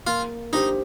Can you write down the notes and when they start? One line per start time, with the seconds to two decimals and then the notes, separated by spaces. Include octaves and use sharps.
0.06 A#3 F4
0.52 D4 D#4 G4 C5